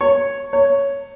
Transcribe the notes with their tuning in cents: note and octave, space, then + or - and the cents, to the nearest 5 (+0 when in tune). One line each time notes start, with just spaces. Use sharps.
C#5 +0
C#5 +5